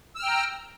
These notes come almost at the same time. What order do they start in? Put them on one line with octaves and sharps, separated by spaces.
E6 F6 G5 A#5